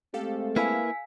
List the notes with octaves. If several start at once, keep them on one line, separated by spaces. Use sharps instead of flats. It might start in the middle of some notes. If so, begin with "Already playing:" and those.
G#3 A3 C4 G4 A4 F5
A#3 E4 B4 F5 G#5 E6 B6